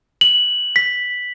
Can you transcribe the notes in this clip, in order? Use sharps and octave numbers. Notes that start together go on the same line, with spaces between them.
F#7
B6